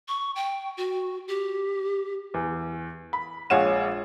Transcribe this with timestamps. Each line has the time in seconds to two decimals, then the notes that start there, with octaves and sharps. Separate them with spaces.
0.08 C#6
0.36 G5
0.77 F#4
1.28 G4
2.34 E2
3.13 B5
3.50 A#1 G#3 C#5 F5 F#5 E7